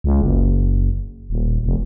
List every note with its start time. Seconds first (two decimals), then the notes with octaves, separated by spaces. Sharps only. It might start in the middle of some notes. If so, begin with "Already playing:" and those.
0.04 C#2
0.22 F#1
1.30 D#1
1.64 F1